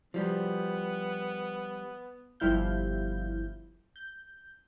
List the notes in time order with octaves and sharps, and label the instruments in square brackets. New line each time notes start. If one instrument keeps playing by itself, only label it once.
[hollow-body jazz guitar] F3 G3 [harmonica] B3
[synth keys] G1 F3 G3 E4 F5 G6
G6